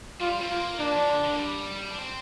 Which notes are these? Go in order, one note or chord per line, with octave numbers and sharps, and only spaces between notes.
G3 F4
C4
A#3 F4
A#3 D4
F3
D3
D3
A#3
G3
D4
C4